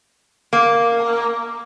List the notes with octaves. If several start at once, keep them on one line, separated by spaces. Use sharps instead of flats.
A#3